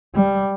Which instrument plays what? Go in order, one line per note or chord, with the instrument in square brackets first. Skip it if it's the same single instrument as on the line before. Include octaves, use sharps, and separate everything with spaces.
[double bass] G3